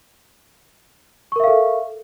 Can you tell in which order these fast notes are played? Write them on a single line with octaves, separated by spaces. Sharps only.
C#6 A#4 E5 F5 A4